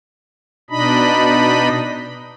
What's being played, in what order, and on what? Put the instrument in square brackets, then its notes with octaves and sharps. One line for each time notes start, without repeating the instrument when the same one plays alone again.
[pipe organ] B2 D4 D#4 D#5 B5